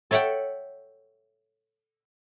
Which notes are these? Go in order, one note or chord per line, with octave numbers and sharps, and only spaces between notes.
A4 C#5 E5 F#5 G5